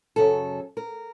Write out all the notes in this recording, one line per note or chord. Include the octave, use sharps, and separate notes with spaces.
F#2 C#3 F#3 A4
A#4